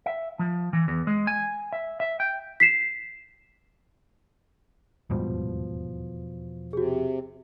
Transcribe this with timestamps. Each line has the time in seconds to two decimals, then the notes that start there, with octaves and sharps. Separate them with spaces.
0.06 E5
0.39 F3
0.73 E3
0.88 E2
1.07 G#3
1.27 G#5
1.73 E5
2.00 E5
2.20 G5
2.60 B6 C7 E7
5.10 D#1 E2 G#2 B2 F3 G3
6.73 C3 F#4 G#4